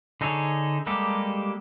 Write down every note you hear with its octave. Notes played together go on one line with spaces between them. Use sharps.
D3 D#4 G#4 A4 C#5
G3 G#3 A#3 G4 A4